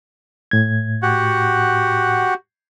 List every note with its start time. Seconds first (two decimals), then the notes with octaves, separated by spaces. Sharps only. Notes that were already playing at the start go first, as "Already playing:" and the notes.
0.51 A2 G#6
1.02 F#4 G4 F#5